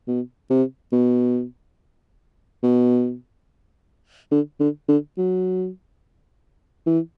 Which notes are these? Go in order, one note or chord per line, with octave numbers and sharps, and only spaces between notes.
B2
C3
B2
B2
D3
D3
D3
F#3
E3